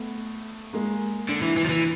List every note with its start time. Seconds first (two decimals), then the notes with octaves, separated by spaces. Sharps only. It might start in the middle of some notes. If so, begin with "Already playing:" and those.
Already playing: A3 B3
0.73 G#3 A#3
1.29 D3
1.42 E3
1.56 E3
1.65 F3
1.69 E3